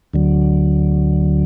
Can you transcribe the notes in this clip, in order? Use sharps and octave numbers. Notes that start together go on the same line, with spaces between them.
D2 D3 F#3